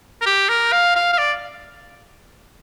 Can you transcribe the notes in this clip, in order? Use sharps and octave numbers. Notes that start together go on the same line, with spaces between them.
A#4
G4
A#4
F5
F5
F5
D5